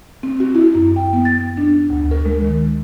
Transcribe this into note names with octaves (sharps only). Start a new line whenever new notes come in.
C4
F#4
E4
F#2
G5
B3
A6
D4
D2
A#4
G#3
D#3